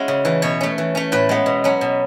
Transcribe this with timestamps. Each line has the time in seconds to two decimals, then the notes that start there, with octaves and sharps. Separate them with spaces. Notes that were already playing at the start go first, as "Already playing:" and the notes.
Already playing: G#3 C#4 E4 F#4
0.08 C#3
0.25 E3 A3
0.42 B2 C#5
0.61 A3 C#4
0.78 E3
0.95 A3 C#4
1.12 A2 B4
1.29 G#3 B3
1.46 B2
1.64 F#3 C#4
1.81 B2